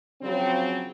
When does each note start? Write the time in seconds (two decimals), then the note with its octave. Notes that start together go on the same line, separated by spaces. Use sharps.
0.22 C#3 F3 F#3 C4